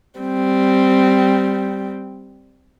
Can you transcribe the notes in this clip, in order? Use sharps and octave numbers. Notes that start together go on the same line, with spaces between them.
G3 C4